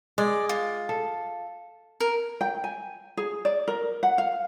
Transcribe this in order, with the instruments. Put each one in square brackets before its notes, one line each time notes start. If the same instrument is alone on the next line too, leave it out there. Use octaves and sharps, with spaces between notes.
[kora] G#3 [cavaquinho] D5
[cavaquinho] F4
[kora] A4
[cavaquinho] A#4
[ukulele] G5
G#5
G#4
D5
A#4
F#5
F5